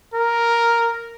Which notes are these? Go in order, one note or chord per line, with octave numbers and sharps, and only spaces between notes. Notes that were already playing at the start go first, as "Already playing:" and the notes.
A#4